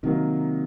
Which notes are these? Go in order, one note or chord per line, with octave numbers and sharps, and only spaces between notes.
C3 D#3 F#3 A#3